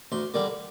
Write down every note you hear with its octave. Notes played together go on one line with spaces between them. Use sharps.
D2 C6
D3 G3 A#3